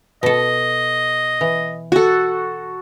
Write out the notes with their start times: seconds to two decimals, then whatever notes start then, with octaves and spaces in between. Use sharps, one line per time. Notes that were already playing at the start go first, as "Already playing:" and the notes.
0.23 B2 A4 D#5
1.41 E3
1.92 F#4 A4